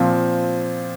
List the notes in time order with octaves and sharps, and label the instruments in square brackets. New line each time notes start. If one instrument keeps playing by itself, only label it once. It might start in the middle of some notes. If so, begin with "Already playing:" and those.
Already playing: [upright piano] A#2 F3 C4